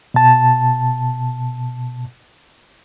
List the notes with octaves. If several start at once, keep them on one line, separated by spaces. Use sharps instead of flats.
B2 A5